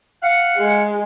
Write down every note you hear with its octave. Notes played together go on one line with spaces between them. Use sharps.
F5 F#5
G#3